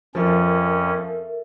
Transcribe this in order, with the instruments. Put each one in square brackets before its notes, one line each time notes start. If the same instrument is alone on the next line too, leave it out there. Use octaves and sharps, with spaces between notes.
[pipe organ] F2 C#4 [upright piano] F3 [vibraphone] A4 A#4 E5